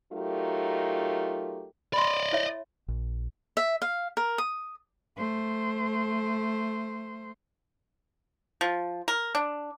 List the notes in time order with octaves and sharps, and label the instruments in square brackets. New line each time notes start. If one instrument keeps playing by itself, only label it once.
[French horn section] F#3 A3 D#4 F4 G4 A#4
[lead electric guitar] D5 D#5 [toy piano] B5 C6
[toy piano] E4 C#5 E5
[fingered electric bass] A#1
[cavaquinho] E5
F5
A#4
D#6
[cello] A3 C5
[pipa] F3
A#4
D4